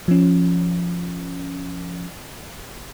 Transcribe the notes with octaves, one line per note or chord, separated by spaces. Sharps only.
F3 C#4